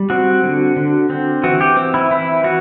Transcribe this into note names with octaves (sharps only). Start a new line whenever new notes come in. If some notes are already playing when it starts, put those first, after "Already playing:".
Already playing: G3
C4 F#4
D3
D3
C4
E3 F#4
G4
C4
E4
E3 E4
E3 F#4